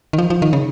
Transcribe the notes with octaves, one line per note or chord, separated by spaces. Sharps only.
D#3
F3
F3
D#3
C#3